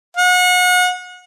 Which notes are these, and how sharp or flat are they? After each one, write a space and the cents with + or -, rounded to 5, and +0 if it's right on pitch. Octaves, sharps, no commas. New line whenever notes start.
F#5 -35